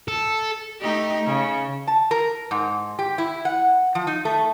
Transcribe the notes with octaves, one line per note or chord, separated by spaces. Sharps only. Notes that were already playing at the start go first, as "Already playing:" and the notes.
A4
A3 D#4 G4
C#3
A5
A#4
G#2
G4
E4
F#5
F3
D#4
A3